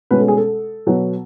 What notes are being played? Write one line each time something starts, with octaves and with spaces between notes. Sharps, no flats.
B2 G#3 C#4 B4
A4
G#4
A4
B2 F#3 B3